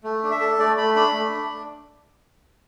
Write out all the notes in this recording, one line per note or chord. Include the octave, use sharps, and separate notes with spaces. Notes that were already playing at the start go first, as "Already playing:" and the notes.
A3
D4
E5
A4
A3 D5
A3 B5
D4 B5
A3
D4